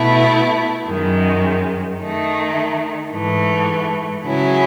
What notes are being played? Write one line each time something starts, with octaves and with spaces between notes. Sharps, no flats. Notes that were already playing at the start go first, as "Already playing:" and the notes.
Already playing: B2 A3 E4
F#2 D#3 G#3
D#3 A3 D#4
G#2 E3 A3
C#3 F#3 C#4 E4